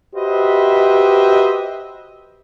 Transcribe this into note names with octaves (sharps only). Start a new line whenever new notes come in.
F#4 G4 B4 C5 D#5 E5